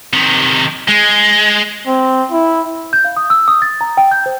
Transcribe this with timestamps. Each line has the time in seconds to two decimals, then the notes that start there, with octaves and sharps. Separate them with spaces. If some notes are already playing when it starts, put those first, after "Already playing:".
0.13 C3 D#3
0.89 G#3
1.87 C4
2.32 E4
2.93 G6
3.05 F5
3.17 D#6
3.30 E6
3.48 D#6
3.62 A6
3.81 A#5
3.97 G5
4.11 G6
4.26 C5